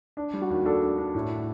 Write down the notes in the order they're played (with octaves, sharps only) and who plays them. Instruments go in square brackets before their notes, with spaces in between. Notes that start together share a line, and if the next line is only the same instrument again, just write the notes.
[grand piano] D4
G3
[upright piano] F#4
[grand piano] D#2
[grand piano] D4 [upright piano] A4
[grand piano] D4
D4
A2